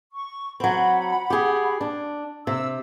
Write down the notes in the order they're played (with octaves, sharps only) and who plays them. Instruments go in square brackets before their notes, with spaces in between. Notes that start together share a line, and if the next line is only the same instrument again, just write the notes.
[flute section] C#6
[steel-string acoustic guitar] F#3 C4 [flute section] F#5 B5
[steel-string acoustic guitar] G4 G#4
D4
[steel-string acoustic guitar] C3 [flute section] E6